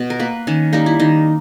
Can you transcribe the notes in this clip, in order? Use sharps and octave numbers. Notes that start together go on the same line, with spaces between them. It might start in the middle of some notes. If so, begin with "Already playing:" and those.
Already playing: B2
A#4
A#3 B4
D#3 C#4
G3 A#3 D#4
E4
D#3 D#4